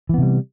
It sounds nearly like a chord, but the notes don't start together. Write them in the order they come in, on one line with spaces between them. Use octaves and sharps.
E3 B3 C3 G3